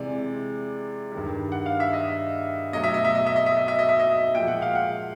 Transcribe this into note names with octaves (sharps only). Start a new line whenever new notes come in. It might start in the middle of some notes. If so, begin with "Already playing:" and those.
Already playing: C3 E3 G#3 D5
G2 D#3 G3
F#5
F5
E5
D#5
B2 F#3 A3 D#5
E5
D#5
E5
D#5
E5
D#5
E5
D#5
E5
D#5
E5
D#5
A#2 F3 G#3 G5
F#5
F5
F#5